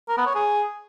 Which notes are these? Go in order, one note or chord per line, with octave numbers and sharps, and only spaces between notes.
A#4
B3
C#5
G#4